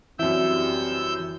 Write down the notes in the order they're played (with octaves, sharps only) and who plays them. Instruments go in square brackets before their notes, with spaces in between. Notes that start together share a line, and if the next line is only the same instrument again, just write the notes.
[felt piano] F#2 E4 [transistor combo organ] E3 [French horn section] G3 C4 [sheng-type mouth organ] E6 G6